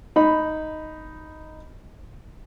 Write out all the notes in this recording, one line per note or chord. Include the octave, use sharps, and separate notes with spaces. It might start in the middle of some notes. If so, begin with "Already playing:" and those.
D#4 B5